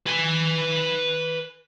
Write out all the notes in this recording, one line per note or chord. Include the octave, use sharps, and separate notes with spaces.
B4 G#5